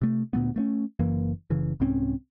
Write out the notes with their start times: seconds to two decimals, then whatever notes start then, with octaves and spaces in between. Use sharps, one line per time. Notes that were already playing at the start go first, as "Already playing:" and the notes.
0.02 C3 A3
0.33 D2 A#2 A3 B3
0.56 A3 A#3 C#4
0.99 F#1 F#2 E3 A#3
1.50 F#1 C#3 E3
1.80 C2 G#2 C4 C#4